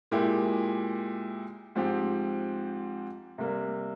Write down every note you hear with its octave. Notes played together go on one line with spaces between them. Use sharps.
A#2 G#3 E4 G4
G#2 F3 C4 G4
C3 G3 A#3